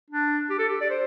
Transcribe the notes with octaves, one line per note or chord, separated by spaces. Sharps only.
D4
G4
A4
G4
D5
C5